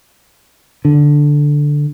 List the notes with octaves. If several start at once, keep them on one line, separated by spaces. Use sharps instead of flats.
D3